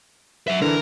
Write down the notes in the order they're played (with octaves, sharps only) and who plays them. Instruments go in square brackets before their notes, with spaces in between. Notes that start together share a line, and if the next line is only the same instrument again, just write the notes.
[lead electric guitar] F#3 E5
[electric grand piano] D3 E3 [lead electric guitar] A#4